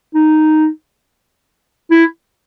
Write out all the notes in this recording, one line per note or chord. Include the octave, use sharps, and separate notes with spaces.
D#4
E4